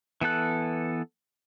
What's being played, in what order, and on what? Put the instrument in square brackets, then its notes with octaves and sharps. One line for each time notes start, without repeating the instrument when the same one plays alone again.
[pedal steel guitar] E3 B3 A4 F#6